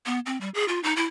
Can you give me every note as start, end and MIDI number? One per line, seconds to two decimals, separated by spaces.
0.06 0.19 59
0.26 0.39 60
0.41 0.49 55
0.54 0.66 68
0.68 0.82 65
0.83 0.94 63
0.96 1.06 64